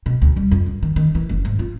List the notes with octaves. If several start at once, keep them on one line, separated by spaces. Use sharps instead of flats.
B2
D2
G3
F2
G2
D#3
D#3
E3
F#1
G#2
F4